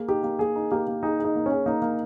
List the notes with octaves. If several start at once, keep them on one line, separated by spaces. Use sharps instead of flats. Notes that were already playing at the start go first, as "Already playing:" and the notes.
Already playing: A#3 G#4
D#4 G4
A#3
A#3 G#4
D#4
A#3 G4
A#3
D#4 G#4
G#4
D#4
A#3
C#4
G#4
A#3 D#4
A#3